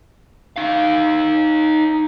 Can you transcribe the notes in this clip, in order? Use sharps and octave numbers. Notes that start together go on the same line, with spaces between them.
D#4 F5